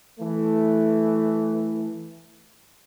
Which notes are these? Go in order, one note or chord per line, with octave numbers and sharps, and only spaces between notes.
E3 A3